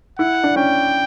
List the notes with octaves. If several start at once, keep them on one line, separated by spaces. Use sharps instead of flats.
E4 F#5
D4
C#4 G5